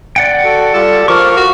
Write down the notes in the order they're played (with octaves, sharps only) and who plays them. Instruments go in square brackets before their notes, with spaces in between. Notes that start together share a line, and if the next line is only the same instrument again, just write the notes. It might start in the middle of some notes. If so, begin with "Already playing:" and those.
[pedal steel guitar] D5 F#5 G5
[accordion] F#4 A4
[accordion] G3 F4 G4 [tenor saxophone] A4
[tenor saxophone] F3 [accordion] A#4 F5 [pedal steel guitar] C#6 D6
[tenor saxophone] F#4